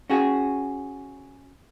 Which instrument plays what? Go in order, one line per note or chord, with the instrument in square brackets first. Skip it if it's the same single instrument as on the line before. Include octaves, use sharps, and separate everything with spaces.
[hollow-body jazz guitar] C#4 F#4 G#4